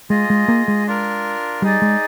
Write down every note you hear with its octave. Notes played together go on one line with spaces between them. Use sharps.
G#3 F4 G#4 D#5
G#3
A#3
G#3
D4 F4 A#4
G3 D#4 G#4 D5
G#3